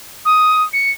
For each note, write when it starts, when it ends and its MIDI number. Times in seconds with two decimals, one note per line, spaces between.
0.25 0.63 87
0.73 0.90 97